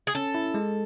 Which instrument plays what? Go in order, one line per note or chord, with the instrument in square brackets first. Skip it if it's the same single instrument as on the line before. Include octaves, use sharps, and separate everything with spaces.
[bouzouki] G#4
[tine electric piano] C#4 [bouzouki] A4
[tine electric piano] E4
G#3